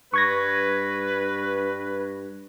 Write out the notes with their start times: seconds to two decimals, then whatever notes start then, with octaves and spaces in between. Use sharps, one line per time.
0.14 G2 B4 C#6 G#6 A#6